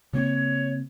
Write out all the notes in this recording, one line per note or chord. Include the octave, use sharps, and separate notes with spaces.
C#3 A#3 C4 C#5